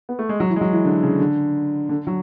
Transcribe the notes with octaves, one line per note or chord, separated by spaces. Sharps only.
B3
A3
G#3
F#3
E3
G#3
F#3
E3
D3
C#3
D3
D3
F#3